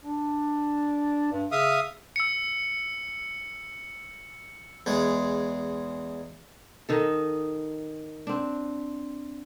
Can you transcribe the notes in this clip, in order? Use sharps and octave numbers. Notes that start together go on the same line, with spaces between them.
D4
G2
C#3 E5 F5 D#6
E6 C#7
E2 G#3
D#3 D#4 A4
C4 D4